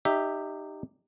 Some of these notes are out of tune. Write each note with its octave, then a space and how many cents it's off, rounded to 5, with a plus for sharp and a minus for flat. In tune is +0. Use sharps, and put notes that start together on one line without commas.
D#4 -25 G4 +0 E5 -5